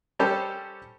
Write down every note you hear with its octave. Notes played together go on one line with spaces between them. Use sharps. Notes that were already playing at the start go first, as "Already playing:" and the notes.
G3 C#4 G4 A4 C5